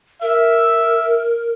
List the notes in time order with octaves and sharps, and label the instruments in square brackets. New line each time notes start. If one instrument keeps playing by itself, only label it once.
[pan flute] A#4 [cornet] E5